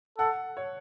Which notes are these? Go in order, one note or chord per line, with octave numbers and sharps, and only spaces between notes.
A4 F#5
C#5